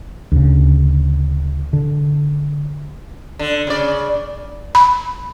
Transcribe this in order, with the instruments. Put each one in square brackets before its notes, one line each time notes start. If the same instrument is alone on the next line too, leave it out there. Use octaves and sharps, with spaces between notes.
[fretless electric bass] D2 C#3
D3
[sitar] D3
C#3 D5
[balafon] B5